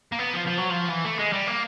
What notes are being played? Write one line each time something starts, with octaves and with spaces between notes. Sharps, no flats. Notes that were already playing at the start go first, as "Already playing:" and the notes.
A#3
B3
F3
F3
F#3
F3
E3
A3
G#3
G3
A#3